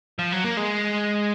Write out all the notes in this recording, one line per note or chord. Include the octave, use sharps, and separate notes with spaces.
F3
F#3
A#3
G#3